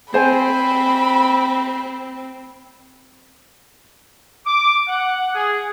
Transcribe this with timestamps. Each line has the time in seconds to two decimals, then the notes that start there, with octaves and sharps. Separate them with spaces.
0.14 C4 C5 G#5 B5
4.47 D6
4.88 F#5
5.35 G#4